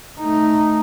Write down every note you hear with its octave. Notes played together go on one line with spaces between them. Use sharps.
A3 D#4